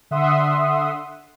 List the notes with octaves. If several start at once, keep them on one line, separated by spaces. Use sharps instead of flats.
D3 E5 F#5 C6 D#6